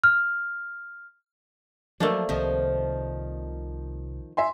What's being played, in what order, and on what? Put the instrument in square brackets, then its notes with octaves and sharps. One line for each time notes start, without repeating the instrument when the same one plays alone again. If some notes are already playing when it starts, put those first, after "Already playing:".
[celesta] F6
[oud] F3 [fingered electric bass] F#3 [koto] A3 A#3 D4
[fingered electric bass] C2 C3 [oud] D#3 F3
[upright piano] E5 G#5 C6